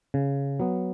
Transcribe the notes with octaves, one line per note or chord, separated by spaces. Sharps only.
C#3
F#3 B3